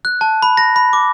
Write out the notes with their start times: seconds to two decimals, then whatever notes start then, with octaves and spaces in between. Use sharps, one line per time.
0.05 F#6
0.21 A5
0.42 B5
0.57 A#6
0.76 B5
0.93 D6